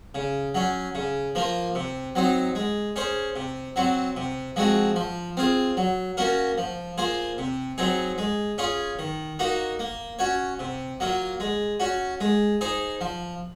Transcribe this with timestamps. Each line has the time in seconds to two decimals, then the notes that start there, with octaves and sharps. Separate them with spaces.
0.15 C#3
0.55 F#3 C#4
0.95 C#3
1.35 F3 A#3 F4
1.75 C3
2.15 F#3 C4 D#4
2.55 G#3
2.96 C#4 G#4 C5
3.36 C3
3.76 F#3 C4 F#4
4.17 C3
4.56 F3 G#3 C4 F#4
4.96 F3
5.37 C4 F4 G#4
5.77 F#3
6.17 A#3 C#4 F#4 A#4
6.58 F3
6.98 A#3 F4 G#4 C5
7.38 C3
7.78 F#3 C4 D#4 G#4
8.18 G#3
8.58 C#4 F4 G#4
8.99 D#3
9.39 A#3 D#4 F#4
9.79 A#3
10.19 C#4 F#4 C#5
10.59 C3
11.00 F#3 A#3 F4
11.40 G#3
11.80 C#4 F#4
12.20 G#3
12.61 D#4 G#4 C5
13.01 F3